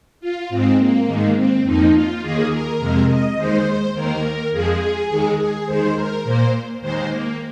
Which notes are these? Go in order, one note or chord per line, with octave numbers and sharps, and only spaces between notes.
F4
G#2 G#3 C4
A#3
G#2 D#3 G#3
C4
F2 F3 A#3 D#4
F4
D#2 D#3 A#3 G#4
A#4
F2 C3 G#3
D#5
D#2 D#3 G#3 C5
D#2 D#3 A#3 A#4
F2 F3 G#3 G#4
D#2 D#3 G#3
G#4
D#2 D#3 G#3 C5
A#4
A#2 A#3 C5
D#2 D#3 G#3 C5
A#3